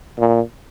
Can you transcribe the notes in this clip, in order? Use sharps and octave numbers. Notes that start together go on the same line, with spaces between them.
A#2